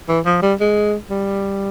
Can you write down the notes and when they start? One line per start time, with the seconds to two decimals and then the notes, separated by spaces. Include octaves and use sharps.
0.08 E3
0.26 F3
0.42 G3
0.60 G#3
1.10 G3